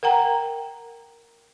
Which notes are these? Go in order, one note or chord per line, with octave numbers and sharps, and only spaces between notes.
A#4 F#5 G5 A#5